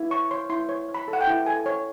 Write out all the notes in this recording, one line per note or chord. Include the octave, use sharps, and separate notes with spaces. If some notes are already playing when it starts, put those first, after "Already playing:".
Already playing: E4
C#5 C#6
C#5 C6
E4 C6
C#5
C#5
B5
A4
F#5
G5
E4
A4 G#5
C#5